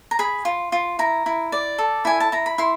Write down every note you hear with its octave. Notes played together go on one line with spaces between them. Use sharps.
A#5
G#4 B5
F4
F4
E4 A#5
E4
D5
A4
E4 G#5
A5
E4 A#5
B5
E4 C6